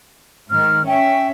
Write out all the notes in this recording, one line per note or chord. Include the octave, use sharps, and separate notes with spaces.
G#2 D#3 F6
C#4 E5 G5